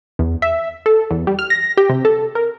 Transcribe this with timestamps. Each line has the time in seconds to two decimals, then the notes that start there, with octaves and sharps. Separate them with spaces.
0.19 E2
0.42 E5
0.86 A4
1.10 E2
1.27 G3
1.39 F6
1.50 A#6
1.77 G4
1.90 C3
2.05 A4
2.35 A#4